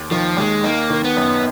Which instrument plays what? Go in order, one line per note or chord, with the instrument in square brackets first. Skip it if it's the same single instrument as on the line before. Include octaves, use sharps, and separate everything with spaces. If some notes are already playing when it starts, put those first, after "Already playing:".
Already playing: [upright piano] D#2
[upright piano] D#3 [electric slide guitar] F3
[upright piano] D#2 [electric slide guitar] G#3
[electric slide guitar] A#3 [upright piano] D#4
[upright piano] D#3
[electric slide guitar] B3
[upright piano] F#2